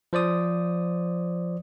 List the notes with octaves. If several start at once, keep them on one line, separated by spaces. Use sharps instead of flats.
F3 C5 D5 D#6